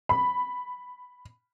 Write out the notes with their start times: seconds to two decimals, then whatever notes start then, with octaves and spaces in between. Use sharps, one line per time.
0.09 B5